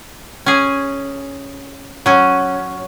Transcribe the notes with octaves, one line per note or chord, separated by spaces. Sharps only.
C#4 G#4
F#3 C#4